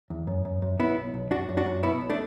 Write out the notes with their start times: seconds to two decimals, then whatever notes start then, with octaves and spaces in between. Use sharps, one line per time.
0.10 E2
0.27 F#2
0.45 F#2
0.62 F#2
0.79 B1 B3 E4
0.97 B1
1.14 B1
1.31 F#2 D4 F#4
1.49 F#2
1.57 D4 F#4
1.66 F#2
1.83 B2 B3 E4
2.01 B1
2.10 A3 D4